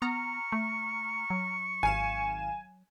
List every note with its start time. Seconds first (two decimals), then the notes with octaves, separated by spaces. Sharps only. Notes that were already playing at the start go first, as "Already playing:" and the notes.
0.02 B3 A#5 C#6 F6
0.52 A3
1.30 F#3
1.83 G#1 F5 G#5 E7